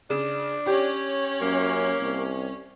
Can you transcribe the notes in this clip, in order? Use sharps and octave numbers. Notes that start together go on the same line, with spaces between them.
C#3 D4
C#4 G4 C#5
F#2 A#3
C2